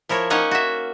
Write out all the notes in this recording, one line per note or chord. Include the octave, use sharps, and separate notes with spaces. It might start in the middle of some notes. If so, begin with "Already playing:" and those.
F3 E4 A#4 C#5
A#3 C#4 D#4 C#5 D#5 F#5
F#4 E5